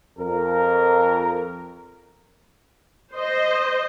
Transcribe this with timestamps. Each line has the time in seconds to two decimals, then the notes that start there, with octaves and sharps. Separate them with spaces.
0.18 F2 A#4
3.14 C5 D#5